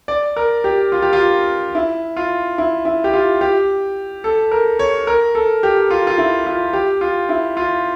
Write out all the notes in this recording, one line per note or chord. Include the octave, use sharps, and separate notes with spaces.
D5
A#4
G4
F4
G4
F4
E4
F4
E4
E4
G4
F4
G4
A4
A#4
C#5
A#4
A4
G4
F4
F4
E4
F4
G4
F4
E4
F4